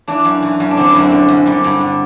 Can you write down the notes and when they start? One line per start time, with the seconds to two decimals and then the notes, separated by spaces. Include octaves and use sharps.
0.08 E3 D4
0.25 F#2
0.42 E3
0.60 F#2
0.71 D4
0.77 D3 C4
0.89 E4
0.95 F#2 C4
1.11 D3
1.29 F#2
1.46 D3 G3
1.64 G2
1.80 D3